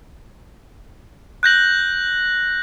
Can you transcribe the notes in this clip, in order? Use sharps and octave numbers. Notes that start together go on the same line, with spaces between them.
F#6 G6 A#6 F#7